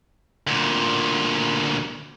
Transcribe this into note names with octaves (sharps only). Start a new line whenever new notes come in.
D2 A#2